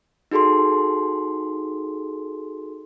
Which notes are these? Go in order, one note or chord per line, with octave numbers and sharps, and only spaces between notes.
D#4 F#4 G#4 A4 C6